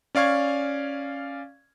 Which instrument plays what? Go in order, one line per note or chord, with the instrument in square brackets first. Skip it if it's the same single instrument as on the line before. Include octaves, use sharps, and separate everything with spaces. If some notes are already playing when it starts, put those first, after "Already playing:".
[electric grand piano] C#4 D5 F5 C#6 G#6